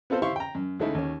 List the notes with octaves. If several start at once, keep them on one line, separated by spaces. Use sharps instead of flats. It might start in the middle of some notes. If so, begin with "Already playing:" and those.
B3 C4 F4 A4 C5
E4 G4 C5 F5 C6 C#6
G5 A#5
F#2
C#2 C#3 A3 D#4 E4
D#2 C#4